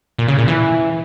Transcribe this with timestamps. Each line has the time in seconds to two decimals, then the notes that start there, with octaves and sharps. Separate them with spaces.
0.18 A#2
0.28 C#3
0.38 A#2
0.48 E3